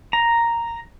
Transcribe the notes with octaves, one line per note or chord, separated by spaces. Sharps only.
A#5